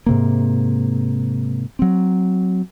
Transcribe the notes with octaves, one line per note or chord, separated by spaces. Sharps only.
G#2 C3 A#3
F#3 C4